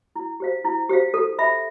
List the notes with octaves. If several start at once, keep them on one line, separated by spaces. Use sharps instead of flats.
E4
G4 C5 F5
E4
G4 C5 F5
A4
E5 B5